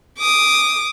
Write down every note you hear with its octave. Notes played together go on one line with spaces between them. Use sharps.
D6 D#6